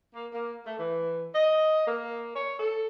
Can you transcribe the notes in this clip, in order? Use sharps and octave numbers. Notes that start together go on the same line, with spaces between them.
A#3
A#3
A3
E3
D#5
A#3
C#5
A4